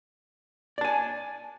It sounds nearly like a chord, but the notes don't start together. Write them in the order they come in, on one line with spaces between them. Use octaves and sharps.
D5 A5 G#5